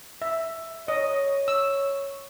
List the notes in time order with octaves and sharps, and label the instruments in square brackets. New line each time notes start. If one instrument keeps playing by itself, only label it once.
[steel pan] E5
[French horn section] C#5 [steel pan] D#5
[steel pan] E6